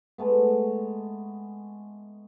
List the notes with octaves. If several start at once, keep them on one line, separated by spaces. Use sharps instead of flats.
G#3 A3 B3